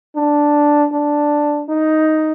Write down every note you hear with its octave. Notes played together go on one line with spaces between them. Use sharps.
D4
D4
D#4